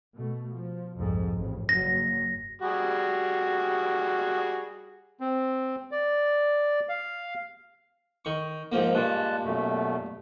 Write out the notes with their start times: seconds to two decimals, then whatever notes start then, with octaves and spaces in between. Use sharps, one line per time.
0.14 B2 A3
0.52 F3
0.95 C2 F2 G#2
1.32 A1 F2
1.69 F#1 G2 F#3 A#6
2.62 G3 F#4 G#4
5.20 C4
5.91 D5
6.89 F5
8.25 D#3 C#6
8.72 G#2 F3 A#3
8.95 G2 A#2 G#3 A5 F#6
9.44 F#2 B2 A3